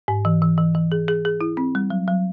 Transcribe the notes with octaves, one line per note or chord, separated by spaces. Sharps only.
G#2
E3
E3
E3
E3
G#4
G#4
G#4
E4
C4
G3
F#3
F#3